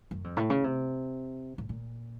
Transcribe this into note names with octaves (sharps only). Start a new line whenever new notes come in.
F#2
F2
A2
C#3
C3
A2
A#2